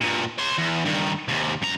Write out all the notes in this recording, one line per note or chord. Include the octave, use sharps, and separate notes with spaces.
G2 A#2
C#5 C6
E2
G2 D#3
D#2 C3
F#2 A#5